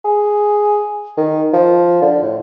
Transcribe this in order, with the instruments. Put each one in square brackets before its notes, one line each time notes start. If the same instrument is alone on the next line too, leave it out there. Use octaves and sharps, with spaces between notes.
[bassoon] G#4
D#3
F3
D3
A2